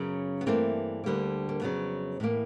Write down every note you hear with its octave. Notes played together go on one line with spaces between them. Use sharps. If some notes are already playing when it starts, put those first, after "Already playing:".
Already playing: F#2 C#3 F#3 B3 C#4
B3
G2 E3 A3 A#3 C4
D2 D3 G3 A#3
A#3
F2 C#3 F#3 B3
A2 E3 G3 A#3